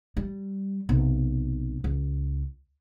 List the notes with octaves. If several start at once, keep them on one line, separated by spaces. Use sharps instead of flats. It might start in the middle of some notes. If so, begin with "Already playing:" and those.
G3
B1 C3
C#2